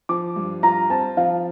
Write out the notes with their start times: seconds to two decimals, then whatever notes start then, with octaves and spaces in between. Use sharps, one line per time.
0.09 F3 D6
0.36 G2
0.63 F4 A#5
0.90 C4 A5
1.17 F3 F5